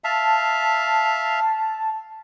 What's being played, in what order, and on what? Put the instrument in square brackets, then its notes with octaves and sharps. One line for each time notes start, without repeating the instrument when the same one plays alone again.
[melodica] E5 F5 [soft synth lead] A5